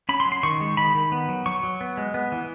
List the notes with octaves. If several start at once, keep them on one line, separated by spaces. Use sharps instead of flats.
C#4 B5
C6
F#3
C6
D#3 C#6
G#3
D#3 B5
D#3
B3
F#3
F#3 C#6
F#3
B3
G#3
B3
E3